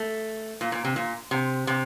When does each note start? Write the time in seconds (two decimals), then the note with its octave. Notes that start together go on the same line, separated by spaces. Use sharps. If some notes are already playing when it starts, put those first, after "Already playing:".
Already playing: A3
0.61 A#2
0.72 A#2
0.85 C3
0.96 A#2
1.31 C3
1.67 C3